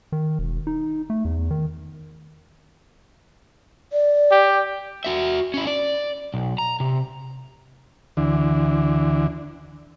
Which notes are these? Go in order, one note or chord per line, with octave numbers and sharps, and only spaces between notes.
D#3
E1
D#4
A3
E2
D#3
D5
G4
F#4 E5
C#4 E4
D5
B1
A#5
C3
D2 D3 E3